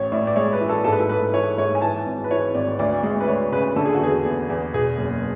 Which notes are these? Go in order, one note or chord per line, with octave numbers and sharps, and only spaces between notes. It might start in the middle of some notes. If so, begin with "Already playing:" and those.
Already playing: A1 C#5
A2 D5
D5
G#3 C#5
B4
E3
A4
G#2 A4
B4
A4
G#2 B4
E3 C#5
G#2 C#5
G#5
E3 A5
G#1
B4
E3 C#5
G#1 D5
D2 D5
G#3
B4
D2 C#5
C#3 B4
D3 A4
G#4
F#4
E2 G#4
E2
E2
B2 G#4
F#1